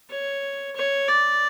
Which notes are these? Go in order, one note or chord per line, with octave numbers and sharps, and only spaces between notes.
C#5
C#5
D5